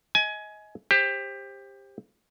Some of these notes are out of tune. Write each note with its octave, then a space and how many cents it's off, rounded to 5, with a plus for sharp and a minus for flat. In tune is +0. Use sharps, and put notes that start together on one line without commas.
D#5 +25 G#5 +20
G4 +20 C5 +20